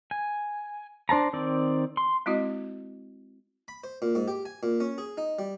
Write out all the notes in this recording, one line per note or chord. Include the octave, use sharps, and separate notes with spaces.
G#5
D4 C5 A5 A#5
D#3 C4 D5
C6
G#3 C4 E4 F#4 D#5
B5
C5
A#2
G#2
G4
G#5
A#2
C#4
G#4
D#4
G3